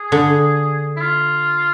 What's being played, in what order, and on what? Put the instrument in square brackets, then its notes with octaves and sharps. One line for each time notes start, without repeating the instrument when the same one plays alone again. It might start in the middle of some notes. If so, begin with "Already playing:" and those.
Already playing: [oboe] G#4
[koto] D3
[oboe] E4
F4